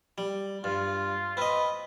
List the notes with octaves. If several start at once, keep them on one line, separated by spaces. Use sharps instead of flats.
G3
G2 F4
C4 B4 D#5